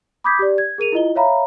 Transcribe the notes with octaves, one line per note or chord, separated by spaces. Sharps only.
B5 D6 D#6 G6 G#6 B6
G4 D5
G#6
G#4 A#4 D#7 F7
E4 F4 D#5 G7
C#5 E5 F5 A#5 B5